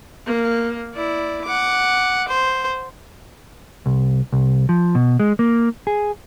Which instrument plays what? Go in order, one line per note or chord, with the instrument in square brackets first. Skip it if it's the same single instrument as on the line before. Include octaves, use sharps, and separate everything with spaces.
[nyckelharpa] A#3
E4 D5
F#5 D6
C5
[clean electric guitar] C2
C2
F3
B2
G#3
A#3
G#4